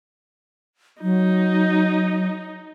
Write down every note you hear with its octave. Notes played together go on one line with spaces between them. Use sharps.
F#3 D#4